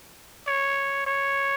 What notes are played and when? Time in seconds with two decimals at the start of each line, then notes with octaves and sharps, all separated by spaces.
0.47 C#5
1.06 C#5